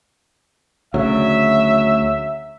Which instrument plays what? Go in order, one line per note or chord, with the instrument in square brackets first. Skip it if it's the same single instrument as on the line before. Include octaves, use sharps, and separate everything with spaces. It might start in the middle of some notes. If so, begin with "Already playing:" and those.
[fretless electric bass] D2 C#3 [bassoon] F#3 [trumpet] E5